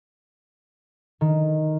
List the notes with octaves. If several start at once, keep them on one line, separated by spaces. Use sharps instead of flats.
D#3